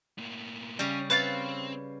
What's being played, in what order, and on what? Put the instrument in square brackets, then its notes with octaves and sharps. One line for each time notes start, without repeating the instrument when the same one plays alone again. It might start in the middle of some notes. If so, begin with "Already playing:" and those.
[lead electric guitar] A2 A#3
[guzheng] C#3 G3 [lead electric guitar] C#4
[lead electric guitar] C4 [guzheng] B4 C#5 F5 [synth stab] A6